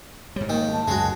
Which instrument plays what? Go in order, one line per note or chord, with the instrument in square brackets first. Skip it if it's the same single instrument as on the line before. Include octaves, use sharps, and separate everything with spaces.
[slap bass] G#2 G3 [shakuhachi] C#5
[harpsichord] D#3 [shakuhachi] A#3
[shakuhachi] A5
[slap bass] C#2 F#2 [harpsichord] G#3 F#4